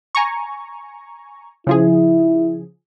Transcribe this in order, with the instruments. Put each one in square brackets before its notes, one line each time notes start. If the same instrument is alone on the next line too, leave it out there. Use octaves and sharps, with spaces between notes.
[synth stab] G#5 A#5 C#6
[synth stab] C#3 F3 G#4 [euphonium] E4